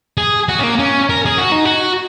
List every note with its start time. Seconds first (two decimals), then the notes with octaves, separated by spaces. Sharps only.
0.18 G#4
0.49 F#4
0.59 C#4
0.63 A#3
0.79 C#4
1.10 A#4
1.26 G#4
1.38 F#4
1.52 D#4
1.65 F#4